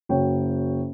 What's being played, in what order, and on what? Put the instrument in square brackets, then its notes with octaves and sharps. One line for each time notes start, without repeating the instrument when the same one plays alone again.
[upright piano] F#1 F#4 C#5 G5